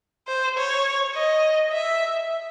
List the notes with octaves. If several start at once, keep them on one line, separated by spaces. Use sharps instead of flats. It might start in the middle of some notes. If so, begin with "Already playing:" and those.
C5
C#5
D#5
E5